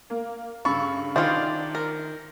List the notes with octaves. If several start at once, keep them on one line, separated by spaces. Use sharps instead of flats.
A#3
G2 C#3 A4 B5 C#6
D#3 D4 F4 G#4 C5 D5
A#4